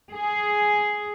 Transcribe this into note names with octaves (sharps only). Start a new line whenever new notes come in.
G#4